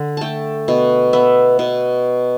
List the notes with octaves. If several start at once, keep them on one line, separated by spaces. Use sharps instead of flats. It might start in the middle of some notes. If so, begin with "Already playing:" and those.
Already playing: D3
A3 G5 A5
B2
B3 E5
B2